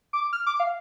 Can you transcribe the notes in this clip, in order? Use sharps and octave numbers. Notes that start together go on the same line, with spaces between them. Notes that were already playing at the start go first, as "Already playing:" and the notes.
D6
F6
D6
F5